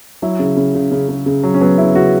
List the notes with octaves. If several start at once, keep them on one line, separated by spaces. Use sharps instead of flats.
F#3 E4
C#3
C#3
C#3
C#3
C#3
C#3
F#3
C#4
F#3 B3
C#3 E4
C#3 F#4